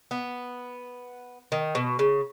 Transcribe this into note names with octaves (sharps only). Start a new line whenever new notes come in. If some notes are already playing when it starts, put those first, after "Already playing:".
B3
D#3
B2
C#3